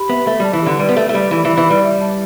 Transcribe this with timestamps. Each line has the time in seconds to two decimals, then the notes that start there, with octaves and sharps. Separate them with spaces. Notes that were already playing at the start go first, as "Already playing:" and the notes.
Already playing: G4 B5
0.09 B3 E5
0.27 A3 E5
0.40 G3 A5
0.53 E3
0.62 D3 G4
0.79 G3 B4
0.89 B3
0.96 A3 E5
1.09 A3
1.14 G3 G4
1.31 E3 D5
1.45 E3
1.49 B5
1.57 E3
1.67 G3 B4
1.83 E5
2.01 A5